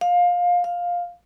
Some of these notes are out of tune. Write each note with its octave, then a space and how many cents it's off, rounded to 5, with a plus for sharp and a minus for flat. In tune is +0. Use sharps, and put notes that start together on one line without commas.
F5 +20
F5 +10